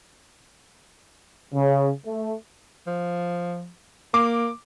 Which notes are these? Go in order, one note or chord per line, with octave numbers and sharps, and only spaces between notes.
C#3
A3
F3
A#3 D6